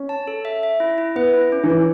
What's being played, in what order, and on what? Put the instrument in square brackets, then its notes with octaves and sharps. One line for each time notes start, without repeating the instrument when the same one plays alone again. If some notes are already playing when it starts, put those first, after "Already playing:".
Already playing: [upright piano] C#4
[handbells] A5
A4
E5
E5
E4
E4
[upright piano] B3 [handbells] B4
[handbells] E4
C#4
[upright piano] E3
[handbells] C#4